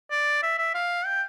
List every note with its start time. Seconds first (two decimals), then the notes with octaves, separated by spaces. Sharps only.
0.11 D5
0.43 E5
0.58 E5
0.75 F5
1.06 G5